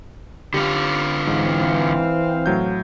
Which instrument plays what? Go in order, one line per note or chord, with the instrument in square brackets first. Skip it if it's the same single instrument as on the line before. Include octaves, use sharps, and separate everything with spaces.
[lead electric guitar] D3 F4 [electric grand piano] G4
[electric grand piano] G#2 [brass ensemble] E3 C4 F5
[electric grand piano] A2 F#3 G6